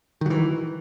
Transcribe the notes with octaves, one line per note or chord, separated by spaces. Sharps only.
D#3 E3 F#3